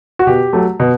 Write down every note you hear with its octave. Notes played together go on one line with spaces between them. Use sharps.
F#4
B2 G4
F#3 A3
B2